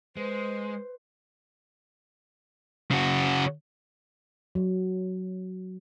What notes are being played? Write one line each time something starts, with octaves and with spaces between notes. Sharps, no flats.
G#3 B4 C5
C#3 F#4
F#3